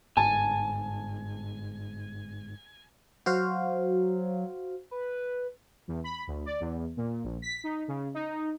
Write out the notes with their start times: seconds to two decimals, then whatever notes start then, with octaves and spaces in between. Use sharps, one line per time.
0.17 G1 G#2 G#5 A5
3.26 F#3 F#4 C5 F5
4.91 B4
5.88 E2
6.04 B5
6.27 D2
6.46 D5
6.60 E2
6.97 A#2
7.24 A#1
7.42 B6
7.64 D#4
7.88 C#3
8.14 D#4